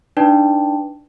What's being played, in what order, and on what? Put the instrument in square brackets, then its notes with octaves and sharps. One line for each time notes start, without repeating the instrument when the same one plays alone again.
[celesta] D4 D#4 B4 D5 G5 A5